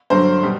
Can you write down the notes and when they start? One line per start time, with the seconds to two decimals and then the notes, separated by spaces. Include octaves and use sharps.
0.10 G2 D3 F#3 C5
0.43 B2 G3